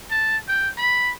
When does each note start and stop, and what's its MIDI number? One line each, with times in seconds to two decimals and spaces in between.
0.11 0.38 81
0.48 0.69 79
0.78 1.11 83